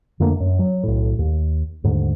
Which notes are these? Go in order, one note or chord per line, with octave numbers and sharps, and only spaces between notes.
F2 D3 A3 A#3
F#2
F#3
B1 A2
D#2
D#2 G#2 D3 A3